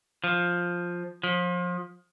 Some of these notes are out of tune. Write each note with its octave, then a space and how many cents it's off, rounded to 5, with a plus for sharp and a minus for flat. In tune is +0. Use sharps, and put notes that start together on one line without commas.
F3 +5
F3 +30